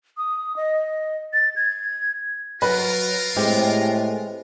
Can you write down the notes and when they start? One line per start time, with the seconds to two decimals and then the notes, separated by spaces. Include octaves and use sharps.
0.17 D#6
0.56 D#5
1.33 A6
1.56 G#6
2.62 F#3 F4 A#4 B4
3.36 A2 G#3 C4 G4